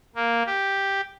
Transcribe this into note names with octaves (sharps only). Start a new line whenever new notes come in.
A#3
G4